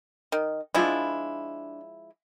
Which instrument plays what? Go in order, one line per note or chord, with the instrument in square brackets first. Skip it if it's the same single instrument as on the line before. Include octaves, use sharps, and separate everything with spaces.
[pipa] D#3
[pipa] F3 G#3 E4 [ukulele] D4 F4 B5